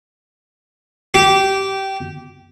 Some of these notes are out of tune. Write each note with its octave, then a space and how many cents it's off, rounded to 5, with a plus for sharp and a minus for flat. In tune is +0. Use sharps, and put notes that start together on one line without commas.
G4 -15